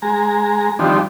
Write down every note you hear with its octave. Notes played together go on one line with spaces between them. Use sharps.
G#3 A#5
D#3 F3 G3 C4 D4